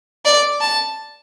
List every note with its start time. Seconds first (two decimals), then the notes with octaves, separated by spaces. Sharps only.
0.25 D5
0.61 A5